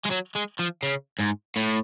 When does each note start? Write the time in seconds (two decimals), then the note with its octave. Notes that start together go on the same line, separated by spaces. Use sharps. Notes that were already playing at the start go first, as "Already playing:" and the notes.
0.05 G#3
0.10 F#3
0.35 G#3
0.59 F3
0.83 C#3
1.20 G#2
1.56 A2